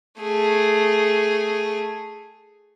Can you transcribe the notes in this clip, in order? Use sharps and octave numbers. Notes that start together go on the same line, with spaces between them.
A3 G#4